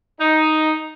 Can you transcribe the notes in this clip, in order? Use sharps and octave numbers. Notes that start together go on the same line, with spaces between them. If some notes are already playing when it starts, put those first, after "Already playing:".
D#4